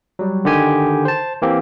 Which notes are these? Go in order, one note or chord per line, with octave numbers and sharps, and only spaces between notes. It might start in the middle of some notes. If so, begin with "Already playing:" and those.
F#3 G3
D3 D#3 G4 G#5
C5 A5
E3 A#3 C4 G4